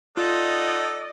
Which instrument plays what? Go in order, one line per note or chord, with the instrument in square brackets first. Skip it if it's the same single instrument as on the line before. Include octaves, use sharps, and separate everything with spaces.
[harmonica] D#4 A4 F#5 [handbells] F4 [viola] D5 D#5